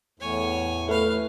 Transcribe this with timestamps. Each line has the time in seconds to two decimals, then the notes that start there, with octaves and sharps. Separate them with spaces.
0.20 E2 A2 C#5 G#5
0.89 A3 B4 F5